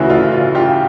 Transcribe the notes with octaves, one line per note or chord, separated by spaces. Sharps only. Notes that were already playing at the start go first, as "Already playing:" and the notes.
Already playing: D2 C#3 E3 E4 F#4
F4
F4
F4 G4